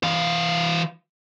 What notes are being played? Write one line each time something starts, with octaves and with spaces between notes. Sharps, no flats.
E3 F5